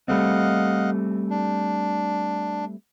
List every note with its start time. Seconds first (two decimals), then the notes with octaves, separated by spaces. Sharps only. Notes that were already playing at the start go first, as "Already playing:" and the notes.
0.08 G3 A3 C4 D#5 F5 F#5
1.30 D4